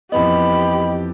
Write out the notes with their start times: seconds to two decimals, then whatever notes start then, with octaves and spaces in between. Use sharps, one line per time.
0.12 F2 E3 B3 G4 D#5 B5